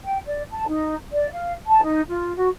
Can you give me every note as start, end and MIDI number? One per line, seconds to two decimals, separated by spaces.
0.04 0.19 79
0.26 0.42 74
0.51 0.65 81
0.68 0.95 63
1.12 1.27 74
1.31 1.53 77
1.68 1.80 81
1.82 2.00 63
2.09 2.34 65
2.35 2.48 66